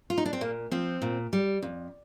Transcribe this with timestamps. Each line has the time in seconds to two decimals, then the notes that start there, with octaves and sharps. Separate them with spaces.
0.10 F4
0.18 D#4
0.26 D4
0.33 C4
0.41 A#2 A#3
0.71 F3 C4
1.02 A#2
1.33 G3
1.62 F2